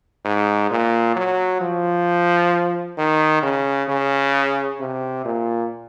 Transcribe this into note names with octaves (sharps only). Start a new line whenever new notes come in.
G#2
A#2
F#3
F3
D#3
C#3
C#3
C3
A#2